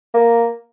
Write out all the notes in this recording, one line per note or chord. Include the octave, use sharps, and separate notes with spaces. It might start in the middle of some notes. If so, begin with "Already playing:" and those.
A#3